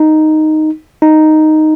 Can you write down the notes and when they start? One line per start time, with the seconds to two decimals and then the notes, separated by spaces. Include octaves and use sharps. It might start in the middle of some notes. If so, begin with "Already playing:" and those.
Already playing: D#4
1.02 D#4